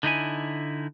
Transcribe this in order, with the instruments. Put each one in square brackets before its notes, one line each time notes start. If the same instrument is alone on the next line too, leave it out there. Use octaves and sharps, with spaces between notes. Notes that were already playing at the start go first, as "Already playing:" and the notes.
[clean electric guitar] D3 D#4 E4 G#5